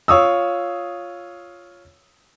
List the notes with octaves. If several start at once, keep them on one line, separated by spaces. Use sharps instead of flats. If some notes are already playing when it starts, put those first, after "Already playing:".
F4 C#5 D#6 E6